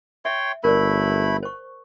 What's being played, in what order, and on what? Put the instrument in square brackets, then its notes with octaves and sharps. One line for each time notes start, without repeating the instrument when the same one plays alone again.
[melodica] C#5 G5 C6 [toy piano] E5
[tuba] G1 [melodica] A3 E4 B5 [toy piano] A#4 C5 D5
[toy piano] C5 C#6